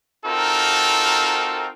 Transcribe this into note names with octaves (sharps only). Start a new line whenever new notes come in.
C4 D#4 F4 F#4 A4 A#4